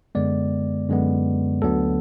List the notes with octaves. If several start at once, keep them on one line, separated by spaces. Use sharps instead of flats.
F#2 D3 G#3 B3 D5
F#2 D3 G#3 B3
D2 D3 F#3 B3 A4